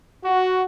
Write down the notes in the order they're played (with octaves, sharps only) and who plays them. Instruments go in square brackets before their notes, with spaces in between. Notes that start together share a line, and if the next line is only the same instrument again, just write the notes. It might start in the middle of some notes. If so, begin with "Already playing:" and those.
[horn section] F#4